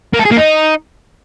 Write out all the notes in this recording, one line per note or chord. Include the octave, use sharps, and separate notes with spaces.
A#3
A4
G#4
A#3
D#4